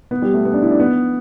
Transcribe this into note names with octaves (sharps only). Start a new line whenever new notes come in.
B3
G3
A3
B3
D4
E4
D4
B3